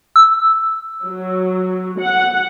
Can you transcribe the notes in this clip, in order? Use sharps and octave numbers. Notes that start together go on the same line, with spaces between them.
E6
F#3
F#5